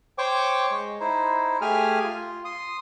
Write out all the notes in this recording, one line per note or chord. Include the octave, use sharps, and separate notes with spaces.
C5 C#5 G5 C#6 D6
G#3
D#4 E4 C5
A3 G4 G#4 G#5 F6
F4
C6 D#6